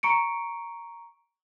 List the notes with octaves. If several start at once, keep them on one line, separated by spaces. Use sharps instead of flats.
A#5 C#6 C#7 D7